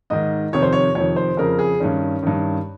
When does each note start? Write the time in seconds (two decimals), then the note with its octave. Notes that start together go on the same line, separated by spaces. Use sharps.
0.10 G#2 D#3 D#5
0.53 F2 C3 D#3 C#5
0.62 C5
0.73 C#5
0.95 F2 C3 D#3 C#5
1.16 C5
1.37 F2 C#3 A#4
1.59 G#4
1.80 G2 D#3 C#4
2.23 G2 D#3